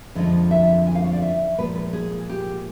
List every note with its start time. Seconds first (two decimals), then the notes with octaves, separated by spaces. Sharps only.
0.15 F2 D3 F3 G#3 D#5
0.51 E5
0.87 G#5
0.95 F5
1.04 C#5
1.13 D5
1.22 E5
1.58 A#2 F3 G#3 B4
1.75 B4
1.93 G#4
2.29 G4